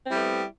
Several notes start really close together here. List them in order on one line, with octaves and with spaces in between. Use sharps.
C4 E4 G3 A3 B3